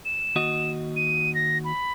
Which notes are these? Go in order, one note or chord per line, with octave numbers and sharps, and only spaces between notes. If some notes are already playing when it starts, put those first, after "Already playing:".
E7
D#2 F#4 D#5
D#7
A#6
B5